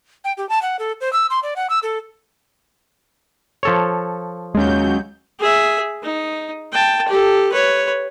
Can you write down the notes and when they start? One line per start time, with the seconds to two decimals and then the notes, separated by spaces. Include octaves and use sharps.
0.24 G5
0.37 G4
0.49 A5
0.62 F#5
0.79 A4
1.01 C5
1.13 E6
1.30 C6
1.43 D5
1.56 F#5
1.70 E6
1.83 A4
3.63 F3 A4 C#5
4.55 D#2 F#3 G#3 C#4 G6
5.39 G#4 E5
6.03 D#4
6.73 G5 A5
7.08 G4 A4
7.52 B4 C#5